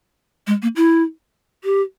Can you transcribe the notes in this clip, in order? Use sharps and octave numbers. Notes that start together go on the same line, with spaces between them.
G#3
A#3
E4
G4